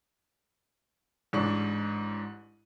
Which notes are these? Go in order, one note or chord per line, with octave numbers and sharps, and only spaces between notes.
A1 G#2 D4 C#6